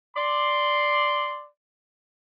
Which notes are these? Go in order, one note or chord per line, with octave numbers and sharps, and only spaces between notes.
D5 C6